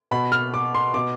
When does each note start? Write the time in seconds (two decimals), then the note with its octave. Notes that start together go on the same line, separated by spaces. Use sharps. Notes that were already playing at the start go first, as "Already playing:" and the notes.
0.11 B2 B5
0.32 F6
0.54 D6
0.75 C6
0.94 B2 D6